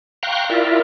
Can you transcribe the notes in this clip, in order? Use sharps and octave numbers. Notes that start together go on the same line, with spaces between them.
F5 G5 A#5 C6 C#6 F#6
E4 F4 A#4 D5 E5